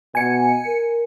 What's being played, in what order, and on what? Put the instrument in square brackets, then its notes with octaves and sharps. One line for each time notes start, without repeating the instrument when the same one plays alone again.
[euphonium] B2 [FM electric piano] G#5 C#7
[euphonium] A#4